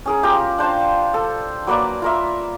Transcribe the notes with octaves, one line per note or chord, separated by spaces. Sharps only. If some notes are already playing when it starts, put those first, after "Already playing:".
C#4 G#4 A#4
F4 G4 A#4
D4 C5 F5 A5
A4
F#3 A#3 B4 D5
F4 A#4 E5